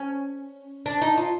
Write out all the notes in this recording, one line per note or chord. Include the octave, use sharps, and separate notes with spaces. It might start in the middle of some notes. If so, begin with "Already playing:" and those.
Already playing: C#4
D4
D#4
F4